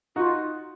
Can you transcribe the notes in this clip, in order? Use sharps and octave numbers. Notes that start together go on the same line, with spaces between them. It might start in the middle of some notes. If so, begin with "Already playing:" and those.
D#4 F4 F#4